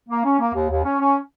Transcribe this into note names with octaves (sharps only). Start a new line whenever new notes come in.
A#3
C#4
A#3
D#2
D#2
C#4
C#4